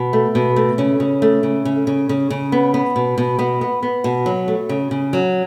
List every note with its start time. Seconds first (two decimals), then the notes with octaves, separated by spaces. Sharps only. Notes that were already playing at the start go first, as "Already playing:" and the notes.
Already playing: B2
0.13 A3
0.35 B2
0.56 A3
0.78 C#3 C#4
1.00 C#3
1.22 A3
1.43 C#3
1.65 C#3
1.87 C#3
2.09 C#3
2.30 C#3
2.52 B3
2.74 B3
2.96 B2
3.18 B2
3.39 B2 B3
3.61 B3
3.83 B3
4.04 B2
4.26 F#3
4.48 A3
4.69 C#3
4.91 C#3
5.13 F#3